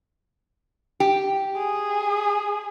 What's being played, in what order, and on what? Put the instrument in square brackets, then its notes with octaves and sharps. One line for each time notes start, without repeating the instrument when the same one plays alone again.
[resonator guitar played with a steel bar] G4
[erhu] G#4